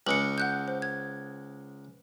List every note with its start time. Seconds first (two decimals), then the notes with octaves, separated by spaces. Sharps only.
0.07 C#2 G#3 C#7 F#7
0.38 F#5 F#6 G6
0.68 C5
0.82 G#6